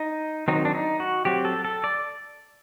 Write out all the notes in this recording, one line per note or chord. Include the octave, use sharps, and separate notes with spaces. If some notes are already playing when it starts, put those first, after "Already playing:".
Already playing: D#4
D#3 F#3 C4 D#4
D4
D#4
F#4
F#3 C4 G4
A4
A4
D5